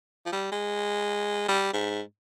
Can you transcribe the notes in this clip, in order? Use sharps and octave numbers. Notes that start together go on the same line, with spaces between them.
F3
G3
G#3
G3
G#2